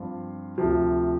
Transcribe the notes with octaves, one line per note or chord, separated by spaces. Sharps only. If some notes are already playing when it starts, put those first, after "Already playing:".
Already playing: G2 F3 C4 F4
D2 C3 F3